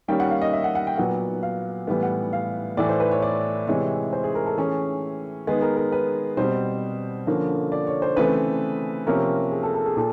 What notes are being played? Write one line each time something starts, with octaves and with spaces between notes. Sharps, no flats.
D#3 G3 A#3 C#4 G5
F#5
F5
D#5
E5
F#5
F#5
G5
A#2 F#3 B3 F#5
F5
A2 E3 G3 B3
F#5
F5
A2 E3 A3 D5
C5
B4
C#5
D5
C3 E3 G#3 C#5
C5
G#4
A#4
A4
E3 A3 C#4 G#4
D#3 G#3 B3 G#4
A#4
A#4
B4
B2 G3 C4 C5
D3 F3 A#3 C#4
D5
C#5
C5
C#3 E3 A3 C4 B4
C3 F3 A#3 C#4 A#4
G#4
A4
A4
G#4
A#2 A4